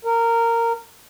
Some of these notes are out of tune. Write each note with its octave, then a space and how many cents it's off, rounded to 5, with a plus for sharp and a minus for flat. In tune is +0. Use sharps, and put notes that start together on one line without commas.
A#4 -15